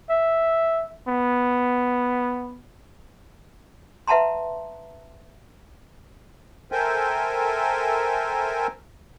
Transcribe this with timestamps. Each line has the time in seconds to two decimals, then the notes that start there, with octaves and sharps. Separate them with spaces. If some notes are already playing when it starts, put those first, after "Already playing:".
0.10 E5
1.08 B3
4.08 B4 E5 F#5 A5 A#5 C6
6.72 A4 A#4 C5 E5 G5 G#5